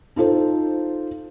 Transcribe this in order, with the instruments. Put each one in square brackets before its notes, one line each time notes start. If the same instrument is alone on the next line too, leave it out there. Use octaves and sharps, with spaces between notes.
[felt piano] D#4 F4 A4 C5